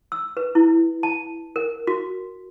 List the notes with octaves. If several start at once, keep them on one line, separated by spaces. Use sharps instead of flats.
E6
B4
E4
A5
A#4
F#4